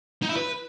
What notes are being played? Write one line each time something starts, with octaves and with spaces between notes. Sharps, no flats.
D#4
E4
B4